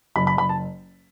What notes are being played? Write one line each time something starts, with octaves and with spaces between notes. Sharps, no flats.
F#1 B5
B5
F#1 B5
A5